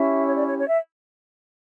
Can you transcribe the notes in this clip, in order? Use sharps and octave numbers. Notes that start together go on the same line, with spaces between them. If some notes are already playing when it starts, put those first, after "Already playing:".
Already playing: C#4 E4 G4 E5
C#5
D5
C#5
C#5
E5